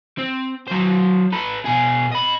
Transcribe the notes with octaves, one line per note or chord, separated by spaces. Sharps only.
C4
F#3 C5
A4 B4
B2 G#4
D#5 B5